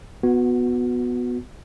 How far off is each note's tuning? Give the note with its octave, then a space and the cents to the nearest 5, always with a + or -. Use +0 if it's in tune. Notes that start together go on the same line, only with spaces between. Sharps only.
B3 +0 F#4 -25